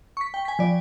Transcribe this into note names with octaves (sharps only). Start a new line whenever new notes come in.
C#6 B6
G5
G#5 B6
F3 D5